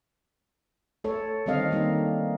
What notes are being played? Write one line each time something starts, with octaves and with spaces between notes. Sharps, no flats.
A3 A4 C#5
D3 D#3 G3 C4 D#5 F5
D#3 G3 A#3 D#4